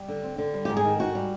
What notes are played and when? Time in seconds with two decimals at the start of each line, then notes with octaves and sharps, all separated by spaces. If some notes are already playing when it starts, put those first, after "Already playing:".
Already playing: G3
0.08 D3
0.24 C4
0.38 D3
0.54 G3
0.65 G#2 G4
0.77 G#4
0.84 D#3
0.99 G#2 F#4
1.15 G3